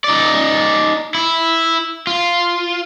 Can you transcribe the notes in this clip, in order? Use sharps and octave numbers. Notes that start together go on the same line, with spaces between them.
D#4 D5
E4
F4